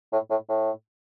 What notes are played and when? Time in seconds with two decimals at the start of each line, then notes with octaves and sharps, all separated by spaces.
0.13 A2
0.30 A2
0.49 A2